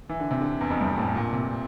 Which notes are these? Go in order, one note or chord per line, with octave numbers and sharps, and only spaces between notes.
E3
D3
C3
D3
E2
F2
G2
A2
A#2
C3